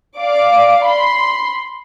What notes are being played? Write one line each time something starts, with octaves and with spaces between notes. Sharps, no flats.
D5 F5 D6
B5 C6